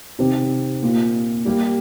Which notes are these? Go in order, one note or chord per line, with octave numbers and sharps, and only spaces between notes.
C3 D#3 C4 G4
A#2 A#3 F4
G3 A#3 G4